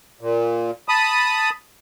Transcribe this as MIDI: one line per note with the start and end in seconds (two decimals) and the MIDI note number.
0.21 0.71 46
0.89 1.50 81
0.89 1.50 83
0.89 1.50 87